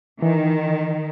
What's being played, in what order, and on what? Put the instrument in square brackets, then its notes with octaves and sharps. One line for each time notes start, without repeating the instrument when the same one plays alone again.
[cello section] D#3 [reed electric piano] E3